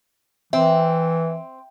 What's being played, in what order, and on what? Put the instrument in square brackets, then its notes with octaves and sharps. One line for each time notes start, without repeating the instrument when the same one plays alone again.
[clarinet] E3 [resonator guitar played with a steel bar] C4 [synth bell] E5